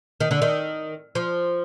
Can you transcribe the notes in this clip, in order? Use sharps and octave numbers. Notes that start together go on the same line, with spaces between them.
D#3
D3
D#3
F3